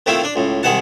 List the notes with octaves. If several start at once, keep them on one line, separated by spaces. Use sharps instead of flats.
D#3 A3 C4 E4 F4
D4
C#2 A2
C2 D#3 G#3 F#5 A5